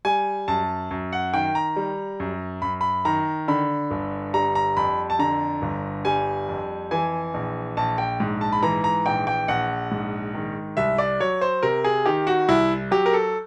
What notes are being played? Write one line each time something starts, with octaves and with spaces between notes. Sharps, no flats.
G3 G#5
F#2 A5
F#2
F#5
D#3 G5
A#5
G3
F#2
F#2 B5
B5
D#3 A#5
D3 B5
G1
G3 A#5
A#5
F2 B5
A5
D3 A#5
G1
G3 G#5
F2
E3 G#5
A#1
A#1 A5
G5
G#2
A5
B5
E3 A#5
A#5
A#1 G5
G5
A#1 F#5
G#2
D#3
C2 E5
D5
F#3 C#5
C5
C3 A#4
G#4
D#3 G4
F#4
C2 E4
F#3 G4
A#4
A4